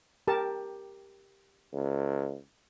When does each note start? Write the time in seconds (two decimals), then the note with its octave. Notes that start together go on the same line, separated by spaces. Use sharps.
0.28 G4 A#4 A5
1.73 C#2